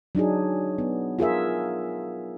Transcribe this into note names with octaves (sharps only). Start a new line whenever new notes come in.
F#3 D4 D#4 G#4
B3
F4 G#4 A#4 E5